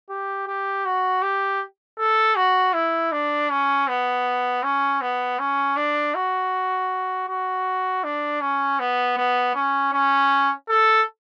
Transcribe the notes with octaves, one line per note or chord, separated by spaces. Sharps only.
G4
G4
F#4
G4
A4
F#4
E4
D4
C#4
B3
C#4
B3
C#4
D4
F#4
F#4
D4
C#4
B3
B3
C#4
C#4
A4